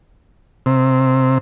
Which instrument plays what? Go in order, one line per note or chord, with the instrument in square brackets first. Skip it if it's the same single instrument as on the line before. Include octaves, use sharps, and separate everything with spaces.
[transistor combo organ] C3